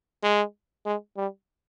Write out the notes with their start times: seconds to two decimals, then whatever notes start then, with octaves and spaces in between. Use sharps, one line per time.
0.23 G#3
0.86 G#3
1.17 G3